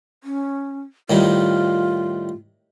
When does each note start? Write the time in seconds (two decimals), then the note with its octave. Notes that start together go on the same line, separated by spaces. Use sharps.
0.24 C#4
1.10 A2 D#3 G3 F4